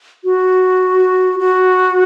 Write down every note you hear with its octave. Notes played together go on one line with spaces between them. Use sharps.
F#4
F#4